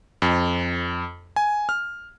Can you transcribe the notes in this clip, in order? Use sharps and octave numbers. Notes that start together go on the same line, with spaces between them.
F2
G#5
F6